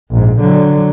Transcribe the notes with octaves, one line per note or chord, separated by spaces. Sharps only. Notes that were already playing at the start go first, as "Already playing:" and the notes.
A#1 G#2
D3 F#3